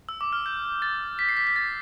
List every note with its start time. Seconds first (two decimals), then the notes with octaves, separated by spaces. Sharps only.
0.09 E6
0.21 D6
0.33 F6
0.46 G6
0.82 A6
1.19 B6
1.29 C7
1.37 B6
1.47 B6
1.56 A6